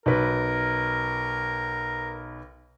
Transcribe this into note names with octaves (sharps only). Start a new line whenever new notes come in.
B1 A#4 B4